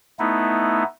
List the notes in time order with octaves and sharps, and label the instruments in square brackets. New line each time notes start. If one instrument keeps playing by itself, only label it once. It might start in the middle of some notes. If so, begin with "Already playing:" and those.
[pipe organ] A3 B3 D#4 E4